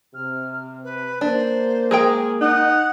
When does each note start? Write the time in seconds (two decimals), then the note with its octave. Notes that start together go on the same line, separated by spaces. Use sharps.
0.14 C3 F6
0.83 B4
1.21 A#3 D4 C5
1.91 G#3 G#4 A#4 G5
2.41 D#4 F#5